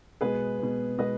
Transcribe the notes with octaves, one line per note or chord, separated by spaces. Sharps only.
B2 G#3 B3 G#4 B4
B2 G#3 B3
B2 G#3 B3 B4 D#5